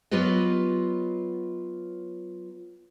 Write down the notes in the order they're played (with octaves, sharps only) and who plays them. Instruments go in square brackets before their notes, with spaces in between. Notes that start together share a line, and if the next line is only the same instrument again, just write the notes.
[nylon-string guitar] F#3 B3 F4 G4 B4 D#5